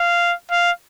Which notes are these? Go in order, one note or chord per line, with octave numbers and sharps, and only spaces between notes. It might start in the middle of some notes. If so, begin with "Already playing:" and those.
Already playing: F5
F5